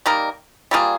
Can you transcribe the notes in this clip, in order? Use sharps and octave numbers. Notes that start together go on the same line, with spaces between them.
G3 A#3 D#4 A#4
G3 A#3 F4 G#4